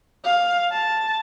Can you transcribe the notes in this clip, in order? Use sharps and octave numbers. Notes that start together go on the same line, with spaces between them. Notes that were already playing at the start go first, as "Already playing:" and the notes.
F5
A5